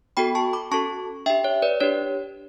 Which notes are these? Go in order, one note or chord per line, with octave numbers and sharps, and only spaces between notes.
B3 F#4 A4 G5 B5
A5 C#6
B5 D6
C#4 F#4 A4 A5 C#6
D4 G4 E5 G5
C#5
B4 D5
D4 G4 C#5